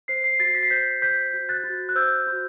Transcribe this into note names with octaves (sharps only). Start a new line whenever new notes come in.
C5 C7
C7
F#4 A6 C7
B6
C7
C5 G6 B6
C5 G6 B6
F#4
F#6 A6
F#4
F#6
C5 E6 G6
F#4